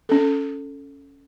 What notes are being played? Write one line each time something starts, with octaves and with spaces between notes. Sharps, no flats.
C#4 A4